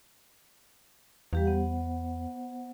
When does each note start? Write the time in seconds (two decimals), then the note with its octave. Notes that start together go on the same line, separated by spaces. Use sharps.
1.33 E2 G3 G4 F5
1.45 B3 C5 F#5